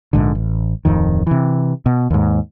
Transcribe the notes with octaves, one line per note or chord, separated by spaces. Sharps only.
A#1 G#2 D3
A1
D1 F2 D#3
C3 E3
B2
D#2 G#2